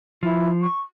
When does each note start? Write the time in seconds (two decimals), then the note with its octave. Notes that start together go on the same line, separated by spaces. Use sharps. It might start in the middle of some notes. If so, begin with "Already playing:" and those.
0.23 F3 E4
0.62 C#6